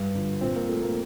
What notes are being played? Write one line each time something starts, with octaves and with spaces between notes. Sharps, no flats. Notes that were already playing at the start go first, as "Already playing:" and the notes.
Already playing: G2
D3 F3
A#2 C4 C5
A#3 A#4
F3 A3 A4
A#3 A#4